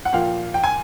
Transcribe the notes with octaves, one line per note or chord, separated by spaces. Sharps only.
F#5
A#2 F3 A#3 F5 G5
G5
G#5